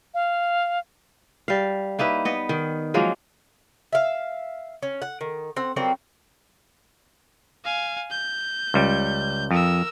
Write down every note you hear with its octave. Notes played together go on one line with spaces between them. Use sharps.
F5
G3 F5
A#3 D#4 E4 B4
B3 D#5
D#3
F3 F#3 G#3 A#3
E5 F5
C#4
F#5
D#3
C4 F#5
F#3 G3 A#3 C4
F5 G#5
G6
C#2 G3
F2 A#4 E6